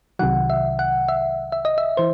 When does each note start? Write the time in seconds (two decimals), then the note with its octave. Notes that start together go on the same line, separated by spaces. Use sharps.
0.19 C2 C3 D#3 F#3 F#5
0.50 E5
0.79 F#5
1.08 E5
1.52 E5
1.65 D#5
1.78 E5
1.97 E3 C5